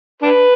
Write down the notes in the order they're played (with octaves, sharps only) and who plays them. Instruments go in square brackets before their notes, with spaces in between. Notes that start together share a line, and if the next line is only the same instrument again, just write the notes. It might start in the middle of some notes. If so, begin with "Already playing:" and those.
[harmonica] D4 B4